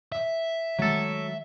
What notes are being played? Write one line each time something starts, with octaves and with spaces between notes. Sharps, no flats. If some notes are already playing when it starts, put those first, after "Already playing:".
E5
D#3 F#3 G#3 A3 A4